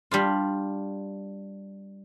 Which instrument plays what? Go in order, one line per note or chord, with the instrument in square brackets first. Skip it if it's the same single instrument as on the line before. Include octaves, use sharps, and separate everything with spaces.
[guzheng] G3 D4 F4